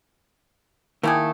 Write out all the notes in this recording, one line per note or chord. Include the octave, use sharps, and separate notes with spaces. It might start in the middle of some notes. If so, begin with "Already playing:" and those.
D#3 A3 A#3 E4 G4 G#4